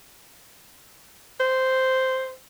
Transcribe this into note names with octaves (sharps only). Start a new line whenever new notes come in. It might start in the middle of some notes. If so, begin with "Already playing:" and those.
C5